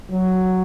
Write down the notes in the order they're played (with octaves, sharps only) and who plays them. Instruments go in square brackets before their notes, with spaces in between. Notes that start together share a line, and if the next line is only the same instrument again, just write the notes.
[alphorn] F#3